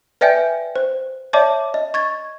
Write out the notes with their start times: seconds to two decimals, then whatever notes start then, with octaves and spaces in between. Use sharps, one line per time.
0.21 B4 D5 E5 G5 G#5 G6
0.76 C5
1.33 C#5 D5 E5 A5 D6
1.74 D#5
1.94 C#6 G#6 A6